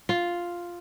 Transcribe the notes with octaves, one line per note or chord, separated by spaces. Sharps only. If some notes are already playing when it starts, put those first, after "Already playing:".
F4